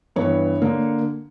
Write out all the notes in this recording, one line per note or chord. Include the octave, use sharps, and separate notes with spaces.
G2 E3 B3 C#5
D3 A#3